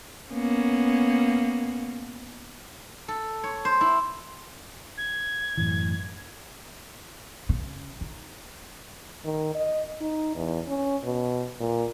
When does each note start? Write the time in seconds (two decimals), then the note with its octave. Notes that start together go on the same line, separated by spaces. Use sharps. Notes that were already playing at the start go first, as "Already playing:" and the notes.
0.33 A#3 B3 C#4
3.08 A4
3.44 C#5
3.65 C5
3.81 E4
4.98 G#6
5.57 F#2 A2 E3
7.49 C#3
8.01 D#4
9.24 D#3
9.55 D#5
10.01 D#4
10.36 E2
10.68 C#4
11.04 B2
11.60 A#2